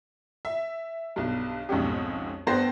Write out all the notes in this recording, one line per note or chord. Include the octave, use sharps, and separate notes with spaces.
E5
B1 G2
B1 F2 G#2 C#4 G4
G2 A3 B3 C5 G5 A#6